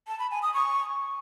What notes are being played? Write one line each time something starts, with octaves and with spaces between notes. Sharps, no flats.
A5
B5
G#5
D#6
C#6